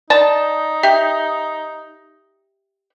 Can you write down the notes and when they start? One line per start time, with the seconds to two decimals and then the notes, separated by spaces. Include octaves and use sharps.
0.10 D#4 D5 A5
0.83 G4 E5